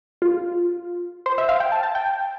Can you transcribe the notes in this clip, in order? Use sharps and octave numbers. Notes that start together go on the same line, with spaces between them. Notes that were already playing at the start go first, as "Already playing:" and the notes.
F4
C5
E5
F5
G5
A5
A5
G5